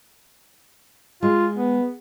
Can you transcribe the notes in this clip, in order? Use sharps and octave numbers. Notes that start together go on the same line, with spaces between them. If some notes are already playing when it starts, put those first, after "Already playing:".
G#3 F4
B3